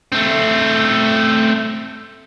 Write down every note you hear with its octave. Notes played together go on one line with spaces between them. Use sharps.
A3 C4